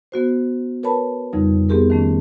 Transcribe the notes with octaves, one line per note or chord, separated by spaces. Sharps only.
B3 F#4 C5
A#4 B4 C#5 A5 B5
F2 C#3 G3 D#4
B3 C4 G4 G#4 A#4
D#3 A3 C#4